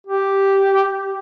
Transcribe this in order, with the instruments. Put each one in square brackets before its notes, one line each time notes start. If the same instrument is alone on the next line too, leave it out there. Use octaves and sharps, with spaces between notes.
[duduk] G4